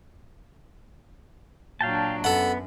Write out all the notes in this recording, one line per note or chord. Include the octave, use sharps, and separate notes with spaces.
A#2 F#3 D4 F5 G5 A5
F#2 B3 A4 F#5